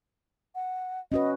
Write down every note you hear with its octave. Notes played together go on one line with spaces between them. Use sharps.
F#5
C#4 F#4 B4 D#5